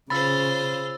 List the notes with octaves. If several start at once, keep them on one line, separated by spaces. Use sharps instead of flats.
C#3 F4 C5 B5 E6 A6